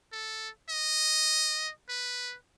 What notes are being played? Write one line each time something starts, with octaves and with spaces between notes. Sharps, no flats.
A4
D#5
B4